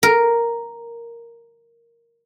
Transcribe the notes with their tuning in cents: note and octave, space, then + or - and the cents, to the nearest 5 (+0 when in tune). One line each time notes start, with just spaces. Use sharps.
A#4 +0